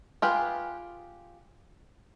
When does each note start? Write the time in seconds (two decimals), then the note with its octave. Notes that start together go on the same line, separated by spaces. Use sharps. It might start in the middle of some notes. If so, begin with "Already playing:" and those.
0.22 F4 G4 G#4 B4